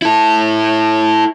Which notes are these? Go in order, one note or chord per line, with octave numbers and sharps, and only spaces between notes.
E4 A4